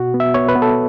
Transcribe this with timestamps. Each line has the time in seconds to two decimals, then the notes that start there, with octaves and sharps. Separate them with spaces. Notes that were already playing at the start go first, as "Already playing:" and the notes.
Already playing: B2 F#4
0.14 B3
0.20 E5
0.34 B3 C#5
0.49 B4
0.55 B3
0.62 A4